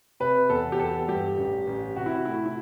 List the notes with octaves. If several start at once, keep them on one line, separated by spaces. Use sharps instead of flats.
C3 B4
E2 A4
G4
E2 A4
G2 G4
A1
A1
C3 F#4
E4
F#4
A3 E4
E4